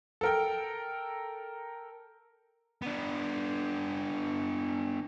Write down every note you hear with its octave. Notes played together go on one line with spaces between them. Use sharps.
A4 A#4 G5
B3 D4